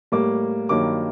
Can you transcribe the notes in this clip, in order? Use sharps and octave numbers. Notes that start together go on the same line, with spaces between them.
A2 G3 A#3 D6
G2 D#3 F#3 A#3 D6